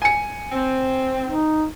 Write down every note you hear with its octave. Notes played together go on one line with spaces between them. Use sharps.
G#5 C#7
C4
D#4